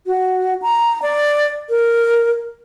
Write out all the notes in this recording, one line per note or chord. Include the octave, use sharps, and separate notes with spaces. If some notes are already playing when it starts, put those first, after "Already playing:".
F#4
A#5
D5
A#4